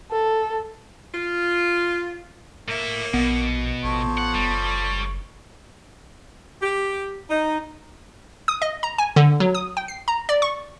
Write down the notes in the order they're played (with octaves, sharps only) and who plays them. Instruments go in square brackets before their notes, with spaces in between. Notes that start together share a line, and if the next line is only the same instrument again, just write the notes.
[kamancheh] A4
[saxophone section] F4
[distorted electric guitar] A2 E5 [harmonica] A#3
[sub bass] A#1 [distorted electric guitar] B2 [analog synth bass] B3
[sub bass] A1 [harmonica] F3 A4 C#5
[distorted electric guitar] F#5
[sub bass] F#1 [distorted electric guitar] G3
[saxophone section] G4
D#4
[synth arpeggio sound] D#6
D#5
A#5
G#5
D3
F#3
D#6
G5
C7
A#5
D5
C#6